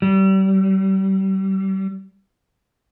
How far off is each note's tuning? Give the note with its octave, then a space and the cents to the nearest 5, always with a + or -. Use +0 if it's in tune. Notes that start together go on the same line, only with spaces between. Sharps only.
G3 -30